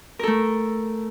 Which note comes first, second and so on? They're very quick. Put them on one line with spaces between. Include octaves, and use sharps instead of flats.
A#4 A4 A3